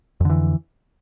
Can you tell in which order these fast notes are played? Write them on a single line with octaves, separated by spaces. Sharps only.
F2 D3 E3